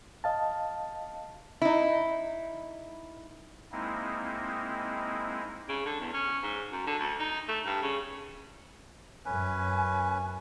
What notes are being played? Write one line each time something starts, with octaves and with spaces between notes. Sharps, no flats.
D#5 F5 A5
D#4 E4
G#3 A#3 C4 D#4 E4
C#3
D3
E2
C#4
G#2
F#2
D3
D2
D#4
A3
G2
C#3
F#2 C#4 B4 G#5